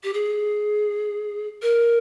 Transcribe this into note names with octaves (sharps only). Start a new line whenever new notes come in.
G4
G#4
A#4